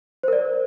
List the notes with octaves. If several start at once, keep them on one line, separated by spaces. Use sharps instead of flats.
A#4 C5 D5